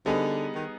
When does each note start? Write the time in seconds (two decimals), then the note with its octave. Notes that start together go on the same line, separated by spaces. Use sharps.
0.06 D3 G3 B3 D#4 G#4 B4
0.55 D#3